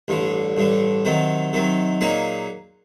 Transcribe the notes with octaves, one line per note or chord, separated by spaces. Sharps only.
A1 G2 D3
A1 G2 D3
C3 D#3 F#3
C3 D#3 F#3
A#2 F#3 A#3 D#4 G#4